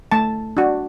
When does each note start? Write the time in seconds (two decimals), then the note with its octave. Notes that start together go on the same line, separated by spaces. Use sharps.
0.12 A3 A5
0.57 D4 F#4